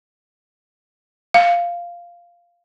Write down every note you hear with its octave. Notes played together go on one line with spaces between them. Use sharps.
F5